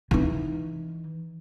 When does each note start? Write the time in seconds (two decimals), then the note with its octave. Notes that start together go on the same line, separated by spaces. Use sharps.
0.11 E3 D#4